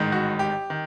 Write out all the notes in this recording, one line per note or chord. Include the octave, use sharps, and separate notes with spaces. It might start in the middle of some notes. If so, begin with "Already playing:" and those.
Already playing: A1 G#2 D#3
F#4
G4
D#3